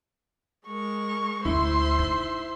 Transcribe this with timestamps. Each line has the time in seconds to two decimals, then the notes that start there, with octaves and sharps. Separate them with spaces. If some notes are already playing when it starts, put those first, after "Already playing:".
0.67 G#3 A#4 C#6
1.45 D2 C#4 E4 C5 E5 C6
1.98 D#4